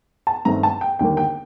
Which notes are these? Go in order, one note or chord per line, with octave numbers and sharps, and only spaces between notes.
A5
G2 D#3 A3 C4 A#5
A5
G5
D#2 D3 G3 A#3 G5
G5